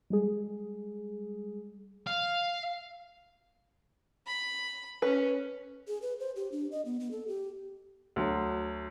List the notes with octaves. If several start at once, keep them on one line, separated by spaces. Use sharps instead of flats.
G3 G#3 G#4
F5
B5
C#4 B4
G#4
B4
C5
G4
D4
D#5
B3
B3
A4
G4
D2 F#3